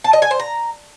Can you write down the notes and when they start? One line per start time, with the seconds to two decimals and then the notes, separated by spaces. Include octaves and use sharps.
0.04 A5
0.13 D#5
0.22 G#5
0.31 C5
0.40 A#5